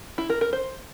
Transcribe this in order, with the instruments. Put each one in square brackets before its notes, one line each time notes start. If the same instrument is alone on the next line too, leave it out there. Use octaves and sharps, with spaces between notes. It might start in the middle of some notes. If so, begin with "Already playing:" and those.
[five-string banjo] E4
A#4
A#4
C5